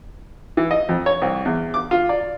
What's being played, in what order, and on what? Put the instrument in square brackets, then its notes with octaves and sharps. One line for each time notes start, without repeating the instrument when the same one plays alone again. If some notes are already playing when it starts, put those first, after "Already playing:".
[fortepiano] E3
D#5
F2
C#5
C2
E2
D6
F4
D5